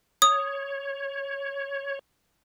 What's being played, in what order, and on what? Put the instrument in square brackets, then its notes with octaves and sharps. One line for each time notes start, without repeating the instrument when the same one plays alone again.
[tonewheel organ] C#5 [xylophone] D#6